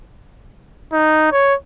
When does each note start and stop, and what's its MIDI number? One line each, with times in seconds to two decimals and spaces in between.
0.93 1.27 63
1.32 1.55 73